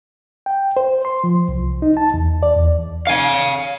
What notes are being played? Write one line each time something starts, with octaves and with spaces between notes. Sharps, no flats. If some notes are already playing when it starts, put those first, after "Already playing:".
G5
C5
C6
F3
C2
D#4
A5
E2
D5
E2
F5 G#5